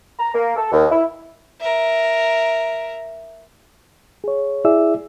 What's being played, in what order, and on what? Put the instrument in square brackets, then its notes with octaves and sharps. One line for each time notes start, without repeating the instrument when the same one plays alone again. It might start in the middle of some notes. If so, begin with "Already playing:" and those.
[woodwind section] A#5
A#3
A4
D#2
E4
[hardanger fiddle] A#4 E5
[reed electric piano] G#4 C#5
E4 G#4 D5 E5 E6